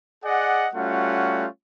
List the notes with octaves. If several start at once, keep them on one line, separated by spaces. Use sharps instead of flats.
G#4 D5 D#5 F#5
G3 A3 C#4 F4 F#4 F#5